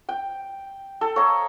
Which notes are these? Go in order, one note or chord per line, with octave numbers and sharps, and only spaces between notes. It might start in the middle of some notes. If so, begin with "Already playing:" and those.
G5
A4
C#5 D#5 F5 A#5